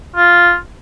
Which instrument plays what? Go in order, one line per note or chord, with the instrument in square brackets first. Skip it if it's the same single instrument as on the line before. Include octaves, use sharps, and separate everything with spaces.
[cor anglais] F4